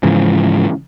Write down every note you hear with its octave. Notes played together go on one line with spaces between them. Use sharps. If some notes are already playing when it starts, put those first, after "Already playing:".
G#2 C#3 E3 F3